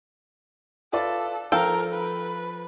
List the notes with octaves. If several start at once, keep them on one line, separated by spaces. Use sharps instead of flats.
F4 A4 B4 D5
F3 A4 A#4 F5 G5
B4